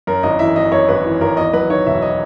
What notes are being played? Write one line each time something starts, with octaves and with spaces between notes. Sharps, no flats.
F#2 A#4
G#1 D#5
E3 E5
G#1 D#5
F#2 C#5
G#1 B4
E3
G#1 A#4
E2 D#5
F#3 B4
D#3 C#5
E1 E5
D#5